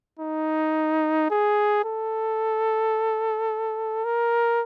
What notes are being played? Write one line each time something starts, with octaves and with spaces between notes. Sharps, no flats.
D#4
G#4
A4
A#4